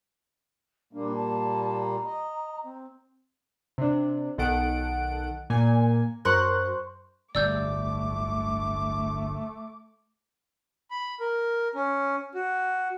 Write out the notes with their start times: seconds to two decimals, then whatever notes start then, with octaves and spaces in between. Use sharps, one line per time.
0.93 A#2 G3 A#3 D4
1.15 A5
1.79 A#5
2.06 D#5
2.64 C4
3.78 C3 D4
4.38 B1 D#3 A4 F#5 D7
5.50 A#2 A#3 G#5
6.25 F#2 A#4 C5 C#6 F#6
7.35 D1 G1 G3 A3 D5 D6 E6 G6
10.91 B5
11.20 A#4
11.75 C#4
12.35 F#4